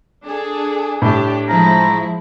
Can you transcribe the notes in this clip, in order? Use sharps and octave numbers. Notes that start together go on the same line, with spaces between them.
D4 G#4 A4
A2 D4 G4
F3 G#3 E4 A#5